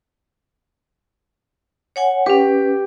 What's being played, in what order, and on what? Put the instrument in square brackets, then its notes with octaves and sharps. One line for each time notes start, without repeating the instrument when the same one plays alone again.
[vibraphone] C#5 F#5 G#5
[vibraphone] C#4 B4 [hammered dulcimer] G4